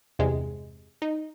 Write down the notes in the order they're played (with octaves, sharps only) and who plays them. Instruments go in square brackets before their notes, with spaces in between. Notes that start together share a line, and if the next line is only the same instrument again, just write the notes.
[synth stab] E2 G2 C3 G#3
D#4